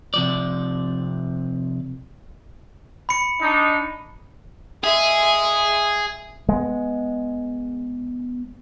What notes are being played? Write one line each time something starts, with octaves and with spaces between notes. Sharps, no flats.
C3 F3 D5
B5 C#7
D4 D#4
G#3 G#4 E5
G#3 B3